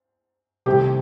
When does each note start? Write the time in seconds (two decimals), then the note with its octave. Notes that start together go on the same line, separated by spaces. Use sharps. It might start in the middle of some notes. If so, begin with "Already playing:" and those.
0.66 C2 C3 D#3 A3 C4 G4